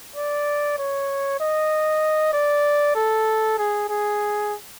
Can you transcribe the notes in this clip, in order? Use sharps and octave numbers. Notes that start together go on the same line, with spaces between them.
D5
C#5
D#5
D5
A4
G#4
G#4